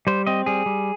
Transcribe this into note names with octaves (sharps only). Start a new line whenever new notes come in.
G3 C5
C4 D#5
G3 G#4
G3